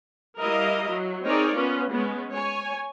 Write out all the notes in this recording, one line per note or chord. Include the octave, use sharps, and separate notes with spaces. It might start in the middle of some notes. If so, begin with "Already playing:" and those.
G3 E4 A#4 D#5 F5
F#3
C4 D#4 G#4 A#4 C#5 D5
B3 C#4 F4
G#3 B3 C#4
C#5 G#5